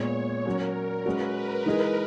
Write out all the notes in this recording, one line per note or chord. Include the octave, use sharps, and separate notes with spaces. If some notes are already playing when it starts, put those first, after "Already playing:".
Already playing: A#2 G#3 B3 C#5
F#3 C#4 F#4 A#4
G#3 C#4 F#4 B4
A#4
E3 G#3 D#4 G#4